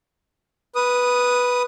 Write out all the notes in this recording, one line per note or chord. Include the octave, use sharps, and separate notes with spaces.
B4 D#6